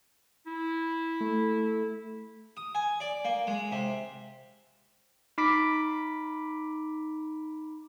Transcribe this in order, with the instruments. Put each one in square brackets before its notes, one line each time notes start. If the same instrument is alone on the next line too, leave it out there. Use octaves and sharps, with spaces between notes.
[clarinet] E4
[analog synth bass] A3
[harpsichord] D#6
G#5
D5
A#3
G#3
C3
[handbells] D#4 B5 D6 B6 D7